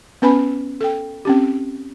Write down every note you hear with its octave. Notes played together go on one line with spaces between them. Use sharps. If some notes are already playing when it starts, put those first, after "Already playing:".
B3 C#4 B4 G#5 B5
A4 G5
C4 C#4 G4